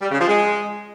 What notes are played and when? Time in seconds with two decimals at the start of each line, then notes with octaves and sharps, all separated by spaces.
0.01 G3
0.10 C#3
0.19 F3
0.28 G#3